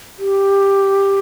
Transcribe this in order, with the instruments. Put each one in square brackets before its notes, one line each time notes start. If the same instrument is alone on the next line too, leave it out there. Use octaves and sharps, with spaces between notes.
[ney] G4